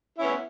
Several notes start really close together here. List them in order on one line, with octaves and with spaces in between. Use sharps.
E4 C#4 B3